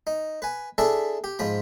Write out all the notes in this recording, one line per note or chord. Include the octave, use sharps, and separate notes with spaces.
D#4
B4 G#5
D4 E4 G#4 A4 E5 A5
G4
G#2 F3 F4 B5